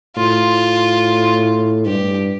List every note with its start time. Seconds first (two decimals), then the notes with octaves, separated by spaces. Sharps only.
0.17 A2 F4
1.86 G2 G4